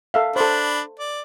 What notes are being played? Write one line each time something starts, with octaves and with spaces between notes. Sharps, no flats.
A4 E5 F5
D4 A4 C5 B5
D5